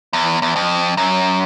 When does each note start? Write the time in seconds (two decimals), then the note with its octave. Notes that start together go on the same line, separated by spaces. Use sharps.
0.13 E2
0.42 E2
0.56 F2
0.97 F#2